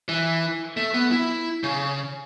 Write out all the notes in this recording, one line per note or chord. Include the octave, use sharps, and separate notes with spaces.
E3
A3
B3
E4
C#3